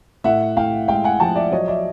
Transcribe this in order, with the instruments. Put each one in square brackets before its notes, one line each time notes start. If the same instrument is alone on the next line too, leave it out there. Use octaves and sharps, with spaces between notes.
[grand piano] A2 E5 F#5
A2 F5 G5
G#3 F5 G5
F#5 G#5
F3 G5 A5
D5 E5
F#3 C#5 D#5
D5 E5